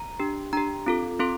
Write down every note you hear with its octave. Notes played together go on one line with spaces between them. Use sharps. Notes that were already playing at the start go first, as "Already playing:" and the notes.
Already playing: A#5
D4 G4
D4 G4 A#5
C4 F4 A4
C4 F4 A4 C6